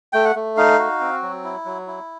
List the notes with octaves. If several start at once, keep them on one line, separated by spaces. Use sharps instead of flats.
A3 G5
F#5
A3
D#4 F5
F#4
C4
F#3
E4
F#3
E4